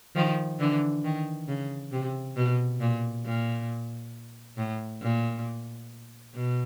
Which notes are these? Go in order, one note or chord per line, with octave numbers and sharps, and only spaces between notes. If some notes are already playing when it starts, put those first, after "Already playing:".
D#3 F3
D3 E3
D#3
C#3
C3
B2
A#2
A#2
A2
A#2
B2